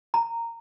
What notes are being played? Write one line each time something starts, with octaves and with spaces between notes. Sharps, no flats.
A#5